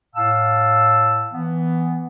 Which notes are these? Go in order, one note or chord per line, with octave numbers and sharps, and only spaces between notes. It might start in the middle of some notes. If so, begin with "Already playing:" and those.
A2 F5 A5 E6
E3 B3